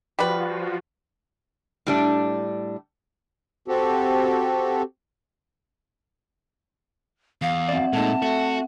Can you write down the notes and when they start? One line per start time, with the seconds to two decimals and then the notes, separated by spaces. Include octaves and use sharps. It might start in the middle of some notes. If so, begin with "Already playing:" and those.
0.19 F3 G3 F4 F#4 B4
1.86 A2 G3 D4
3.68 C4 F#4 G4 A4
7.42 E2 F5
7.68 F#2 C4 D5 E5 F#5
7.93 A#2 G#3 A3 D#4 A5
8.22 A3 F#4